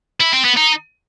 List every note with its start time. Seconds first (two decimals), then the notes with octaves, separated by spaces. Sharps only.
0.21 E4
0.33 C4
0.45 B3
0.56 D#4